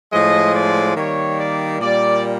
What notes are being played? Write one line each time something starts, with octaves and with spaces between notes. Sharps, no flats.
A2 F3 G#3 D#5
D5
D#3 G3 A#3 C#5
D5
A#2 G3 A#3 D5